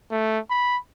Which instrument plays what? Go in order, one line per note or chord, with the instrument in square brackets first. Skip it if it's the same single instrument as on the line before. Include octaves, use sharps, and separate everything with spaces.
[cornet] A3
B5